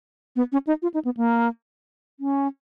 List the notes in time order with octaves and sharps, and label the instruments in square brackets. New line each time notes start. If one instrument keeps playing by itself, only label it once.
[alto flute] B3
C#4
D#4
F4
D#4
B3
A#3
C#4